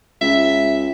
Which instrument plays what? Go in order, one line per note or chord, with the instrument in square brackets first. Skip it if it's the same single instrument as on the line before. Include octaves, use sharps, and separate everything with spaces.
[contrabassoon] C#2 [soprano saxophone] E5